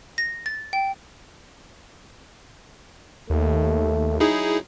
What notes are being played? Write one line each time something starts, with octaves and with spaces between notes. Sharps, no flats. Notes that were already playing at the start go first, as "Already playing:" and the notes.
A#6
A6
G5
D#2 A3
F#3 D#4 E4 G#4